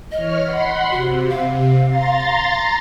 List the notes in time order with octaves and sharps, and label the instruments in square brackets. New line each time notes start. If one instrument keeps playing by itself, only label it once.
[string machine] E3 C#5 F6 [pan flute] D#5
[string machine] F#5 B5 C6
[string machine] C3 [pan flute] F#4
[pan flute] F5
[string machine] A#5 C6 A6